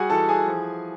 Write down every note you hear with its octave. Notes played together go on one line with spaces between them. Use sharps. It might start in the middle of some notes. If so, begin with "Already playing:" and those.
Already playing: G3 F#4 G#4 F#5 G#5
E3 A4 A5
G#4 G#5
F3